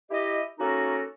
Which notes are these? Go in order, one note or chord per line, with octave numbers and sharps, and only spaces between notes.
E4 G4 D#5
A#3 C#4 D#4 F#4 A4 A#4